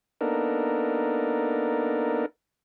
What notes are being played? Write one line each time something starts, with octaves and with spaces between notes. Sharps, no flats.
A#3 B3 D4 D#4 A4 A#4